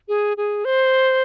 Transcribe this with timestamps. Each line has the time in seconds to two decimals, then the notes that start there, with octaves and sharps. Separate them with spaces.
0.08 G#4
0.37 G#4
0.65 C5